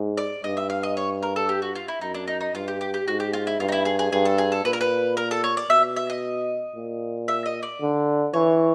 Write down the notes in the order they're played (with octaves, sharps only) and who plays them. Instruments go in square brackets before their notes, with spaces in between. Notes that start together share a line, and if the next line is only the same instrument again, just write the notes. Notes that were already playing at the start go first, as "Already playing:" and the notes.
Already playing: [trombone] G#2
[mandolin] D5
[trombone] G2 [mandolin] D#5
[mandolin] E5
F5
D#5
C#5
A#4
A4
G4
F#4
F4
E4
[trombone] F#2 [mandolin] D#4
[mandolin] D4
D#4
D#4
[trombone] G2 [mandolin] F4
[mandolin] G4
G4
G4
[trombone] G#2 [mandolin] F#4
[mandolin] G4
F4
E4
[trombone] G2 [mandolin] F4
[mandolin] D#4
E4
G#4
G#4
[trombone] G2 [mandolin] G#4
[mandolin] A4
G#4
A4
[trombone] A#2 [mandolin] B4
[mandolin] A#4
B4
A#4
A4
C#5
D5
[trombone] B2 [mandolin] E5
[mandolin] E5
D#5
[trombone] A#2
[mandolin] E5
D#5
D5
[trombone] D3
[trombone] E3 [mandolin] C#5